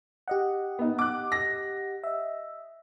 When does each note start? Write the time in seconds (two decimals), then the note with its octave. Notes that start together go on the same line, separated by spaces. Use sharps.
0.28 G4 D#5 F#5
0.79 B3 D#4
0.99 D6 F#6
1.32 A#6
2.04 D#5 E5